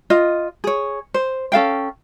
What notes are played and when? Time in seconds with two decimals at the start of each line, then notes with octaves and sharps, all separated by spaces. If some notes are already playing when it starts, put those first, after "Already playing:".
0.10 F4 D#5
0.64 G#4 C#5
1.14 C5
1.52 C#4 A4 F5 G5